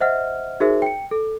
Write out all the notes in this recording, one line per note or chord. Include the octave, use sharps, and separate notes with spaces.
C5 D#5 E5 F#5 F6
D#4 F#4 G#4 A#4 C5 E5
G5 C#7
A4